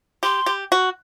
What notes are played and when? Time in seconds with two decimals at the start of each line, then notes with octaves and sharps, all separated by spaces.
0.23 G4 C6
0.46 G4
0.72 F#4